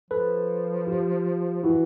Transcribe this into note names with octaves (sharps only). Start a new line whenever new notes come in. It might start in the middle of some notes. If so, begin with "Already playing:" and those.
F3 A4 B4
F4 G4
E3 E4 F#4